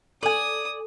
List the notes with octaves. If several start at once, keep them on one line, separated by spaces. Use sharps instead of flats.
A4 D5 G#5 D#6